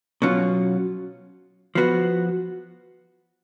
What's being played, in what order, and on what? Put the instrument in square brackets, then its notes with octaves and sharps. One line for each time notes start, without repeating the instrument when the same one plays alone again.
[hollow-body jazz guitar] B2 F#3 C#4 F4
F3 B3 F#4